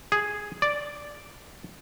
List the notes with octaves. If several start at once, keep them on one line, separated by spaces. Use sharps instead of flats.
G#4
D5